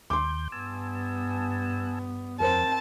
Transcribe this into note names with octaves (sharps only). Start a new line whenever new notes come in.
D#2 C6 D6 G6
G2 B3 G#5 A5 E6
F2 C4 A#4 C5 A5